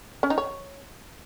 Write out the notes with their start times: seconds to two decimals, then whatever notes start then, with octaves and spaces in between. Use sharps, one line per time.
0.23 C#4
0.30 D#4
0.38 C#5